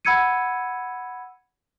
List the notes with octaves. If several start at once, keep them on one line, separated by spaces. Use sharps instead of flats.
F#5 B5 E6 G#6 C#7 D#7